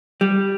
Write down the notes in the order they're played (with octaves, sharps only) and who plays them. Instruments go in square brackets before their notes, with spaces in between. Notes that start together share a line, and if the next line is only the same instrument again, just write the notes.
[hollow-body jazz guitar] G3